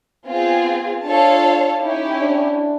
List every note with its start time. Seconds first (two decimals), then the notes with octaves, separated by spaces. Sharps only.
0.25 B3 C4 F4 G#4
1.03 D4 F4 A4 C#5 F5 A5
1.81 C#4 D#4 E4 G4
2.20 D4